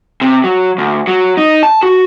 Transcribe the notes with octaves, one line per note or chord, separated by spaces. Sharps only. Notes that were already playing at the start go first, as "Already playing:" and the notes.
C3
F#3
D2
F#3
D#4
A5
F#4